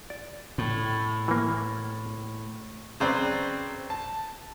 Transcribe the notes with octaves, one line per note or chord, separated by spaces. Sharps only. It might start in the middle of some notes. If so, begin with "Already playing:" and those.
D5
A2
E3 A#3
C#3 F#3 C4 B4 D5
A5